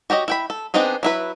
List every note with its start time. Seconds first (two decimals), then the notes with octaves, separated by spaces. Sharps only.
0.10 F#4 G4 C#5 D#5
0.28 E4 G5 B5
0.50 A4
0.74 B3 C4 D4 D#4 G#4
1.03 F#3 E4 B4